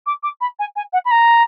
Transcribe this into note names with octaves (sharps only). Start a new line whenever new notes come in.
D6
D6
B5
G#5
G#5
F#5
B5
A#5